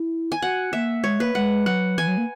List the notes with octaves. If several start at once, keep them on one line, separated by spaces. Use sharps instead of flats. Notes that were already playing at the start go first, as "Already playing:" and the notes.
Already playing: E4
G#5
F#4 F#5
A#3 E5
G#3 C#5
A#3 B4
G#3 F#5
F#3 F#5
E3 G#5
F#3
A#3